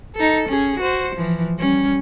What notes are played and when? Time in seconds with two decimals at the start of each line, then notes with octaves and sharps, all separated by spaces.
0.15 D#4 A4
0.48 C#4 G#4
0.79 F#4 C5
1.15 E3 F3
1.58 G3 C#4